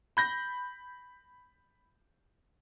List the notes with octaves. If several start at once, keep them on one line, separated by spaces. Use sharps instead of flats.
B5 G6 A#6